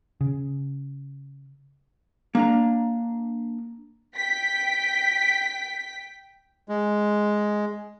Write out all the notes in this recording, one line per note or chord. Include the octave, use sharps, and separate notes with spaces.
C#3
A#3 D4 A#5
G5 B6
G#3